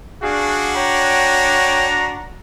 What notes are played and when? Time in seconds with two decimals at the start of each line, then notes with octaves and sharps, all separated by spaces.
0.23 D4 F#4 G#4 F5
0.76 C#5 G5 A#5